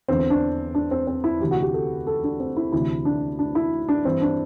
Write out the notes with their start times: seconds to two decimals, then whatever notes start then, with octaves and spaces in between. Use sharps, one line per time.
0.08 E2 D3 C4
0.30 D4
0.75 D4
0.91 C4
1.07 C4
1.24 E4
1.41 D2 C3 E3 G4
1.51 F#4
1.61 G4
1.74 A4
2.07 A4
2.24 D4
2.40 C4
2.57 E4
2.72 D2 C3 E3 E4
3.05 D4
3.39 D4
3.55 E4
3.89 D4
4.05 G2 E3 C4
4.22 D4